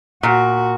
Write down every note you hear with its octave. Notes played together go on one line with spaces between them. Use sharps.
A#2 F#4